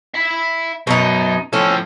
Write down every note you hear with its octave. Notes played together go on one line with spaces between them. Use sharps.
E5 B5
F#2 B2 D#4
A2 F3 C#4 A4